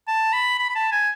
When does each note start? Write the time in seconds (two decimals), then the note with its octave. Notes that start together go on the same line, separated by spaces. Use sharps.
0.08 A5
0.33 B5
0.59 B5
0.69 B5
0.75 A5
0.92 G#5